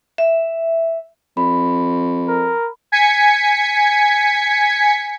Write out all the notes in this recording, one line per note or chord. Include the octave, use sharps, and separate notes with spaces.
E5
F2 B5
A#4
G#5 G#6 B6 C#7